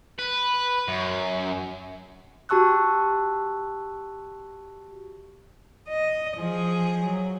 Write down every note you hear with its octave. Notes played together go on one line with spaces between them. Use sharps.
B4
F#2
F#4 G4 A5 C#6 E6 F#6
D#5
F3 G#4
F#3